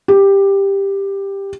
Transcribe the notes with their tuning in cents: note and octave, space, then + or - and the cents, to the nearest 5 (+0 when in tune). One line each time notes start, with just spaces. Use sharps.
G4 +10